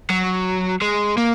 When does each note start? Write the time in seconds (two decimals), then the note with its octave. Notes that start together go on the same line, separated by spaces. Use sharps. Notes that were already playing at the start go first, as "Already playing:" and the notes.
0.10 F#3
0.82 G#3
1.17 A#3